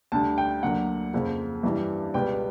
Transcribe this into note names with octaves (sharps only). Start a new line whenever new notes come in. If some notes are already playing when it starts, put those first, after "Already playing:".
D2 D3 G3 A5
G5
D2 D3 F#3 A#3 F#5
F2 C#3 F3 A#3
G2 E3 G3
C#2 B2 G3 B3 G5